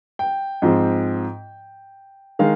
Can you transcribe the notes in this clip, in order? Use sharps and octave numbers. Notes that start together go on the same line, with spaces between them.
G5
G#2 F3 C4
D#3 G#3 F5